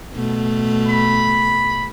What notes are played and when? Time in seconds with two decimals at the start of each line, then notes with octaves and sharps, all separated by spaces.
0.14 B2 A3
0.87 B5